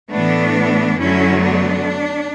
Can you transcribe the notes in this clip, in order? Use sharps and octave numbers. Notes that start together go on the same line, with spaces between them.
A2 E3 A3 B3 D4
F#2 D3 F#3 A3 C#4 E4
B3 D4